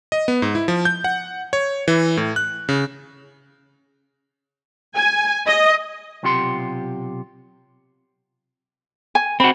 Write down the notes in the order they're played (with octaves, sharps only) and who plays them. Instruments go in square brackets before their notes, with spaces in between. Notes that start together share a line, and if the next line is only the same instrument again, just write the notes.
[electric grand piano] D#5
B3
G#2
E4
F3
G6
F#5
C#5
E3
A2
F#6
C#3
[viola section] G#5
D#5
[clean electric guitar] B1 C3 F4 G4 F#5 C6
[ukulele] G#5
[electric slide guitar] C4 F#4 [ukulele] B5